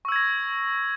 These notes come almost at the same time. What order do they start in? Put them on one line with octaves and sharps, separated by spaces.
C#6 E6 G#6 A#6